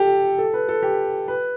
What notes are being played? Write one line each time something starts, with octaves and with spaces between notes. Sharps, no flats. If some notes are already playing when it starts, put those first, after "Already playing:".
Already playing: G4 A4
A4
B4
A4
G4
B4